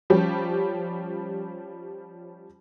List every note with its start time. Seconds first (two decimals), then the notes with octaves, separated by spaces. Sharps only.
0.10 F3 G3 C#4 G4